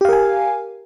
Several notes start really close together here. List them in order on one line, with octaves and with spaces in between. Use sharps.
G4 F5 A#4 G#5